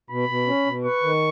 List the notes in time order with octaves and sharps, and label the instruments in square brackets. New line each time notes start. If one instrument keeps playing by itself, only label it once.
[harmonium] B2 [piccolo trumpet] B5
[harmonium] B2
C#4
B2
[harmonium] B4 [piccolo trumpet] C#6
[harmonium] D#3